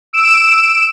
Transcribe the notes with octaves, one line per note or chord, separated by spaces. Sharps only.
E6 D7 E7